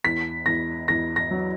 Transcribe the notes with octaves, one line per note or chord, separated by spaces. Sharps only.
E2 B6
E2 A#6
E2 A#6
A#6
F#3